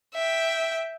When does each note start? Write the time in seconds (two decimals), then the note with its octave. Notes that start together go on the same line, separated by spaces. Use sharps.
0.14 E5 G5